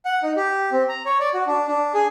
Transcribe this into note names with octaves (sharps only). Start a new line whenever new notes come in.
F#5
D#4
G4
C4
A#5
C#5
D5
F#4
D4
D4
G#4